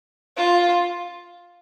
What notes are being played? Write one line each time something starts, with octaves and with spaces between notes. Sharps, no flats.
F4